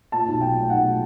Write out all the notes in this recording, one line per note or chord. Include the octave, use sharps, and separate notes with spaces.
A#2 A5
B1
A#2 G5
A3
B1 F#5
A#2